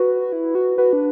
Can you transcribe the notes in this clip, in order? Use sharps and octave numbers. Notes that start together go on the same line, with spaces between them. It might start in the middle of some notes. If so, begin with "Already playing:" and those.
Already playing: F#4 B4
E4
F#4
F#4 B4
D4